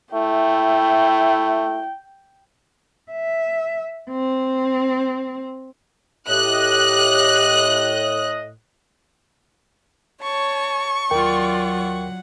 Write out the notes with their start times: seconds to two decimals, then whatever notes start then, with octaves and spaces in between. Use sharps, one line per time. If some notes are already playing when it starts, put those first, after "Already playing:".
0.14 A3 E4 G5
3.12 E5
4.11 C4
6.28 A2 G4 D#5 F#6
10.23 C#5 A5 C#6
11.11 D#2 F#3 F4 A#4 D5 F#5 G5